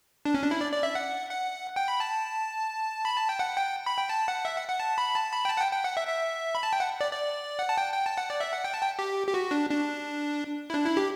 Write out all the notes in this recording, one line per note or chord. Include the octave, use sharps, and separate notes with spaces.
D4
C#4
D4
E4
D5
D5
E5
F#5
F#5
G5
B5
A5
B5
A5
G5
F#5
G5
B5
G5
A5
F#5
E5
F#5
F#5
A5
B5
A5
B5
G5
A5
F#5
G5
G5
F#5
E5
E5
B5
A5
G5
F#5
D5
D5
F#5
A5
G5
G5
A5
F#5
D5
E5
F#5
G5
A5
G5
G4
G4
F#4
D4
D4
E4
D4
E4
G4